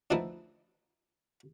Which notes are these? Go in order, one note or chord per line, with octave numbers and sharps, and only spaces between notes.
D3 E3 F3 A3 D#4 E4